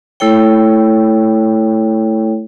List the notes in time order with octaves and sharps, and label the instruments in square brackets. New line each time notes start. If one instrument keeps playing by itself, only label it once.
[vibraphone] A3 E4 A4 C#5 G5